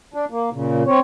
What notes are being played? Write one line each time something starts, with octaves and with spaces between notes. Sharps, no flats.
D4
A#3
A#2 C#3
C4 C#5